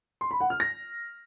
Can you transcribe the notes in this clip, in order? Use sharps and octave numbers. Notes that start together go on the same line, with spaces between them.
C6
B5
F#5
F6
A#6